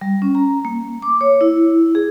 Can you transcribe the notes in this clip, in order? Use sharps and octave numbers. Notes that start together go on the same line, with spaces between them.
G3
C#4
A#5
A#3
D6
C#5
E4
G#4